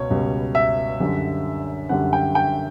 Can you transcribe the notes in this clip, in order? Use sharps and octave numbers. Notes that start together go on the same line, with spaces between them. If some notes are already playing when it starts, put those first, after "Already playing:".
Already playing: C#2 B2 C#5
C#2 B2 G3
E5
F#2 D3 G3
F#2 D3 G3 F#5
G5
G5